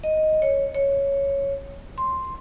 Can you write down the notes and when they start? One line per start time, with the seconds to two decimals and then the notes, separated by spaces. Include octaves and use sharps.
0.04 D#5
0.42 C#5
0.74 C#5
1.98 C6